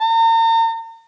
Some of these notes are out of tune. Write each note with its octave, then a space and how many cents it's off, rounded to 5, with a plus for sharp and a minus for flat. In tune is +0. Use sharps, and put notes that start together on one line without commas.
A#5 -40